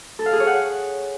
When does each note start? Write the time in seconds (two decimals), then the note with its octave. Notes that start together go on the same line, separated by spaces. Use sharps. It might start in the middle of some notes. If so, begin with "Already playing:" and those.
0.19 A4
0.26 F5
0.33 G#4
0.40 C#5
0.47 F#5